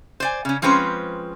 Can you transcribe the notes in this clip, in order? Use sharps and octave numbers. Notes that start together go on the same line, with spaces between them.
C5 D5 G#5
C#3 C#4
F3 G#3 C4 C#4 B4 C5